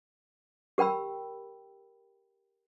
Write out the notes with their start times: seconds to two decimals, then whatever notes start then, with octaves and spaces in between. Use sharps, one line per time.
0.78 G4 A#4 G5 B5 E6